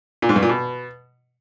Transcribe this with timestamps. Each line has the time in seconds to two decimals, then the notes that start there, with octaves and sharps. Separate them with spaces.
0.22 A#2
0.29 G#2
0.36 G2
0.43 A#2
0.49 B2